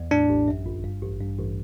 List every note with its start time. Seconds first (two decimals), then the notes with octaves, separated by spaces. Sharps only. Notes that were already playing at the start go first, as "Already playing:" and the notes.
Already playing: E2
0.11 A2 D4
0.30 A1
0.48 F#2
0.66 G1
0.84 G2
1.02 A1
1.20 G2
1.38 A1